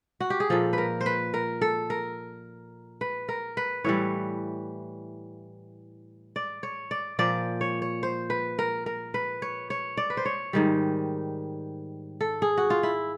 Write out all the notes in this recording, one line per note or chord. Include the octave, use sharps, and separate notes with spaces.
F#4
G4
G#4
A#2 F3 A4
A#4 B4
C5
B4
A#4
A4
A#4
B4
A#4
B4
A2 E3 G3 C#5
D5
C#5
D5
A#2 F3 D5
C#5
C#5
C5
B4
A#4
A#4
B4
C#5
C#5
D5
B4
C5
C#5
G#2 D#3 G3
A4
G#4
F#4
F4
E4